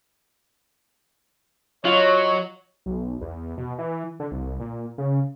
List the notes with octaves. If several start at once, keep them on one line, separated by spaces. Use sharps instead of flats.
F#3 F4 C#5 D#5
B1
E2
B2
E3
D3
C2
A#2
C#3